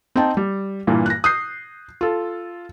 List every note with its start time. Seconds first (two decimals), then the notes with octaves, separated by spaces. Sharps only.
0.16 C4 D#4 G5 A5
0.37 G3
0.87 G2 A#2 E3
1.06 F#6 A#6
1.24 D#6 F#6 G6 C7
2.01 F4 A4